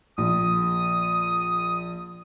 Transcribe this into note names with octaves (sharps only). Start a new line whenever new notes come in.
A#1 D#6